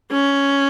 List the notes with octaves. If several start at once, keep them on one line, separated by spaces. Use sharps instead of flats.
C#4